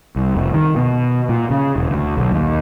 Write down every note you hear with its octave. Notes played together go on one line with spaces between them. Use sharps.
C2
F1
D#3
B2
A#2
C#3
E1
D2
B1
D#2